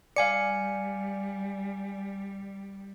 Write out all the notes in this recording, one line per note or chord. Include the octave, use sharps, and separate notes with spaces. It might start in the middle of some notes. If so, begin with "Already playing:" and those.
G3 D5 F5 G#5 C#7